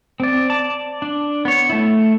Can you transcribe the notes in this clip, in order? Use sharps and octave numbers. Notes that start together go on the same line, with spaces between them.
C4 D5
D5 A5
D4
B3 C#5
A3 E4